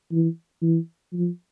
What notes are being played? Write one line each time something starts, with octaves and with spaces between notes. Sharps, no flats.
E3
E3
F3